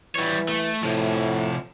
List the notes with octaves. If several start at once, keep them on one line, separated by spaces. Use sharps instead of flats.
E3 G3 C#5
A3
A2 C3 F3